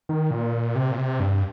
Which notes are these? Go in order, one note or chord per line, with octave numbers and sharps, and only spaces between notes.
D#3
A#2
C3
A#2
C3
G2